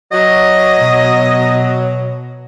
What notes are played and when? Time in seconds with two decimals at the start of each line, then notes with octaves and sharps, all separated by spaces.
0.12 F#3 D#5
0.77 B2